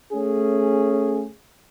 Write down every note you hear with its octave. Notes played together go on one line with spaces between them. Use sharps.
A3 C#4 G#4